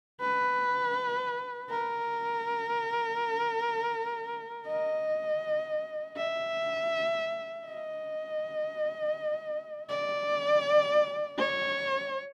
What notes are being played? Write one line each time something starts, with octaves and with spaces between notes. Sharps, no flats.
B4
A#4
D#5
E5
D#5
D5
C#5